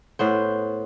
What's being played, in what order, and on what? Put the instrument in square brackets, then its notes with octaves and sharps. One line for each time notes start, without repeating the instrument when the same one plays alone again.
[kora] A2 B3 C5